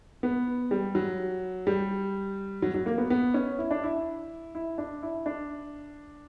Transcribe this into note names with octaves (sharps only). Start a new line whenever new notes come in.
B3
G3
F#3
G3
F#3
F#3
A#3
B3
B3
C#4
E4
D4
E4
E4
D4
E4
D4